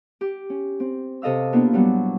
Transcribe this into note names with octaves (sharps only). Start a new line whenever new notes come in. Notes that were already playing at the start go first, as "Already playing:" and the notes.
G4
C#4
C4
C3 A4 D#5 F5 E6
A#3 B3 D4 E4 F4
A#2 F#3 G3 B3